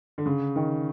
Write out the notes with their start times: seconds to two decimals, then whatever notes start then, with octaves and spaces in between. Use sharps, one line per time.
0.18 D3
0.26 C#3
0.56 D#3